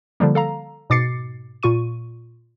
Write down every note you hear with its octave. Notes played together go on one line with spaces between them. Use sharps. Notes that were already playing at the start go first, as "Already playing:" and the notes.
D3 F3 G3 A#3
A4 F5 A#5
G#2 B2 D6 A6 C7 C#7
A#2 F4 C#6 D#7